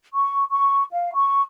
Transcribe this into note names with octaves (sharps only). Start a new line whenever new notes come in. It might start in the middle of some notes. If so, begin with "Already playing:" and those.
C#6
C#6
F5
C#6